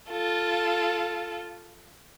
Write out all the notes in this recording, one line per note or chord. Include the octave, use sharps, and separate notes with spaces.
F4 A4